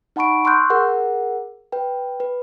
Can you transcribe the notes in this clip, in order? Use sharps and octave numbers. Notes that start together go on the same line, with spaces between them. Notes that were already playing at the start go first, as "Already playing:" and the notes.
D#4 F#5 A5 B5 C#6 D7
C6 C#6 E6 F#6 G6
G#4 A#4 F#5
B4 G5
B4